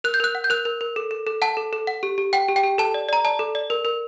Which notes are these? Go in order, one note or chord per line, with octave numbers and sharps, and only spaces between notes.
A#4 F#6
G6
A#4 F#6
F#5
G6
A#4 F#6
A#4
A#4
A4
A4
A4
F#5 A5
A4
A4
F#5
G4
G4
F#5 G5
G4
G5
G4
A4 A5
D5
D5 A#5
D5 A5
A4
D5
A#4
A#4